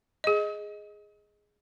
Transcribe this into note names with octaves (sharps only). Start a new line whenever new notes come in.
G#4 D#5